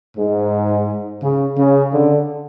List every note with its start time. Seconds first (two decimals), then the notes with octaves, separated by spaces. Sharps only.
0.17 G#2
1.22 C#3
1.57 C#3
1.93 D3